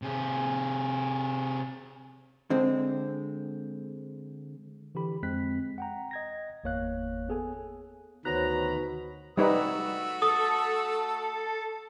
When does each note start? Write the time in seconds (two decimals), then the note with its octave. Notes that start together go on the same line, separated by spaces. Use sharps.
0.02 C3 G#4
2.50 D3 G#3 C4
4.95 D3 E3 G4 B5
5.23 F2 G#3 C4 F#6 B6
5.78 F#5 G5 A#5
6.11 D#5 G#6 A#6
6.64 G1 E2 A#3 C#5 F5 F#6
7.29 B3 G#4 A4 G#5
8.25 D2 B2 D#3 C5 C#5 A#5 B5 F#6
9.37 G3 A3 D#4 F#4 B4 E6
10.22 A4 D#6